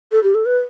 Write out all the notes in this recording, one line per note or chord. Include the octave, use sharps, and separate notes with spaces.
A4
G4
A4
B4